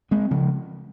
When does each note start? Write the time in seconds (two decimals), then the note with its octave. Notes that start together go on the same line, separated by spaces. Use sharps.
0.11 G#3 C4
0.31 C#3 F3